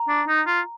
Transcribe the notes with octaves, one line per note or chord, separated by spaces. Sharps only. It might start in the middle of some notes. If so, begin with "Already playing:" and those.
Already playing: A#5
D4
D#4
F4